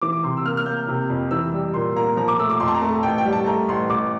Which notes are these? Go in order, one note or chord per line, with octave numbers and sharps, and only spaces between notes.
E3 D6
D6
C3 C6
E6
A#3 F6
F6
A#3 G6
C3
F2
E3 E6
G3
A#2 C6
A#3 A#5
F3 A#5
D6
A3 E6
D6
F2 C6
A5
A#5
A3
A5
A1 G5
G5
G3
A5
A3 A#5
A1 C6
A1 D6